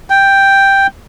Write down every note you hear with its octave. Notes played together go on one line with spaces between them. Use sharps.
G5